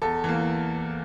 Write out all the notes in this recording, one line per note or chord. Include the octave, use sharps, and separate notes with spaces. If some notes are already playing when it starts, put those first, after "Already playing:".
E2 A4
E3 A#3